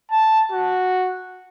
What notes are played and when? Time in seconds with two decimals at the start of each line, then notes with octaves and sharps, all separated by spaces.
0.11 A5
0.52 F#4